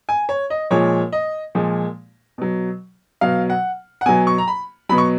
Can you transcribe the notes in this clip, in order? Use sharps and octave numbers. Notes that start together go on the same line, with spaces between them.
G#5
C#5
D#5
A#2 F3 G#3 C#5
D#5
A#2 F3 G#3
B2 F#3
B2 F#3 F5
F#5
F#5
B2 F#3 G#5
C#6
A#5
B5
B2 F#3 B5
C#6